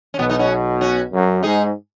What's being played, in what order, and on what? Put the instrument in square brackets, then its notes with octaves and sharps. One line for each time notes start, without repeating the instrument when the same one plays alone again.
[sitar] C#4
[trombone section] B1 B2 [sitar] F#3 B3
[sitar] B3 D#4
C#4 F#4
C#4 F#4
[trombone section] F#2
[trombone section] G#2 [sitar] D#4 G#4